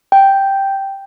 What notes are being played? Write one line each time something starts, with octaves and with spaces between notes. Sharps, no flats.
G5